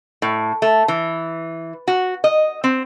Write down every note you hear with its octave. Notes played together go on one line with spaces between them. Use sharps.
A2
A3
E3
F#4
D#5
C4